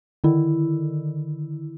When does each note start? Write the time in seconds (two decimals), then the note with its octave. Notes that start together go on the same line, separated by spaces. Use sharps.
0.24 D3 D#3 E4